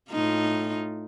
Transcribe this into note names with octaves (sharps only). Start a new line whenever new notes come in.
A2 D#4 F4